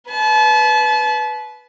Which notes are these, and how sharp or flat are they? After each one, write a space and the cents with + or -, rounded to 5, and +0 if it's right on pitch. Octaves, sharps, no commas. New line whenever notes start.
B4 +0 A5 -35